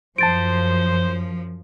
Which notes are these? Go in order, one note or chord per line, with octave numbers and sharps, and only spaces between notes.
F#2 F3 C5 A5 A6 D7